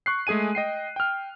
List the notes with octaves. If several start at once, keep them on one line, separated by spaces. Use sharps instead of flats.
C#6 F#6 C7
G#3 A3 G#4 G#5 D#7
D#5 G5 C7
G5 F6